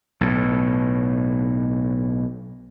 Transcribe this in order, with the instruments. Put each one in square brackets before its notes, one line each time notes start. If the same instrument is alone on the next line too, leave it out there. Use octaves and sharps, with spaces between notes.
[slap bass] B1 A2